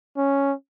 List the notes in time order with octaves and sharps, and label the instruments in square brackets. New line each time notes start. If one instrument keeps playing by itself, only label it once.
[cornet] C#4